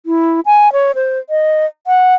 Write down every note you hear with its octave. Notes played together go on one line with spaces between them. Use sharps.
E4
G#5
C#5
C5
D#5
F#5